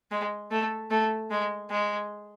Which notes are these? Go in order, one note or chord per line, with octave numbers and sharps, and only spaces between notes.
G#3
A3
A3
G#3
G#3